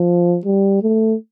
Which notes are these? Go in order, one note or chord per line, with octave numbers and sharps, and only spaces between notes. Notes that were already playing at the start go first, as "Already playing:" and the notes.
Already playing: F3
G3
A3